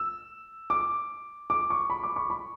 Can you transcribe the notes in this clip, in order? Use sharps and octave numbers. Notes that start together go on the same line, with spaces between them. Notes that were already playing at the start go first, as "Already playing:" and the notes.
Already playing: E6
D6
D6
C#6
B5
D6
C#6
B5